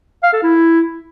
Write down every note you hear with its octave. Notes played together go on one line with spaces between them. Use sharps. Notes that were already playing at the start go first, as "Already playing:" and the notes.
F5
A4
E4